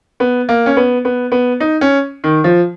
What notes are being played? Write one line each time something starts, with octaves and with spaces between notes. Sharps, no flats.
B3
A#3
C#4
B3
B3
B3
D#4
C#4
D#3
F3